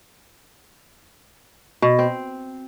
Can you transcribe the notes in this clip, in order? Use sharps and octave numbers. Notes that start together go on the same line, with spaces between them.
B2
C4